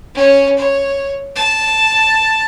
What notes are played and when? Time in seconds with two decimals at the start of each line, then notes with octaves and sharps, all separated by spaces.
0.15 C#4 C#5
0.57 C#5
1.36 A5